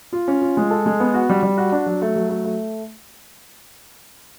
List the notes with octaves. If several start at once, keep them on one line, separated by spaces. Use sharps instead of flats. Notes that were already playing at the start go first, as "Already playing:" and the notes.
F4
C#4
F4
G#3
A4
G#3
B3
F#4
G3
G3
F#4
D4
F#3
A3
F#3
A3
A3